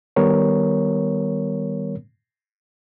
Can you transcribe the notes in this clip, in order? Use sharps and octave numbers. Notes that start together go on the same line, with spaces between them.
D#3 G3 B3 A#4 C#5